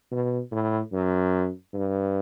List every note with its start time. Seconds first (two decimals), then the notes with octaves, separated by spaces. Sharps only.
0.12 B2
0.52 A2
0.92 F#2
1.73 G2